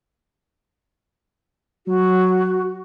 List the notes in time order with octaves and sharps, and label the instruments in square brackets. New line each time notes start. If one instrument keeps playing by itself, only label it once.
[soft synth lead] F#3 [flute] F#4